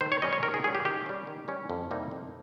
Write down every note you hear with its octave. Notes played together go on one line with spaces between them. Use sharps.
D#3 C5
C#5
G3 C#4 D#5
C#5
D#3 A#4
G#4
G3 C#4 G#4
G4
D#3 G4
G3 C#4
D#3
G3 C#4
F2
C3 G3 A#3 D#4
F2